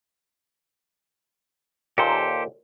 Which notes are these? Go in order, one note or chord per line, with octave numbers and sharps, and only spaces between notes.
D#2 A#2 G4 A4 C5